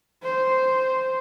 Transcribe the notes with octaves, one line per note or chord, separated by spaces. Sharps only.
C5